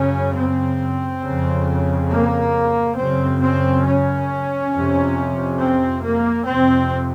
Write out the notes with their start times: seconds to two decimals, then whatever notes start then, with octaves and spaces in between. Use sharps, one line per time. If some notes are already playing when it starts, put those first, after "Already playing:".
Already playing: F#2 C#3 C#4
0.36 C4
1.24 F2 C#3
2.11 A#3
2.98 F#2 C#3 C4
3.41 C4
3.85 C#4
4.73 F2 C3
5.59 C4
6.03 A#3
6.47 F2 C3 C4